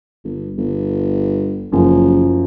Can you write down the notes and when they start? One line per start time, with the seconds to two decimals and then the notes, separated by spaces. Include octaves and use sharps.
0.24 G1
0.58 G1
1.72 F#1 F#2 F3